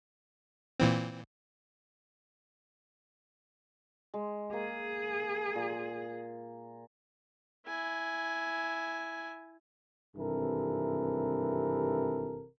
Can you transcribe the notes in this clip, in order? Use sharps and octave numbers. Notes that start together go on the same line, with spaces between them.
A#2 E3 C4
G#3
A#3 G#4
A#2
E4 G#5
G#1 G2 C3 E3 A4 A#4